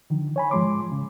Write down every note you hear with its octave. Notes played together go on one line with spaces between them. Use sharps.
D3 D#3 F3
C#5 G#5 B5
G#2 F3 G#3 C6 D6
C#3